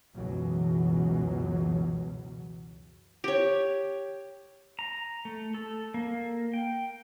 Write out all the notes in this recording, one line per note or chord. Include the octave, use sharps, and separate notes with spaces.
C#2 F#2 B2 E3 F#3
G4 C#5
A#5
A3
A4
A#3
G5